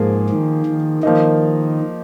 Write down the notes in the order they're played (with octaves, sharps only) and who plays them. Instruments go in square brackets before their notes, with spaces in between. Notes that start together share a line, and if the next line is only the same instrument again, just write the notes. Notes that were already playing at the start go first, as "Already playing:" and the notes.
Already playing: [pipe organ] G#2 [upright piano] F3 A#3 G#4
[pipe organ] D#3
D#3
[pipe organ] D#3 [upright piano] F3 A#3 D#4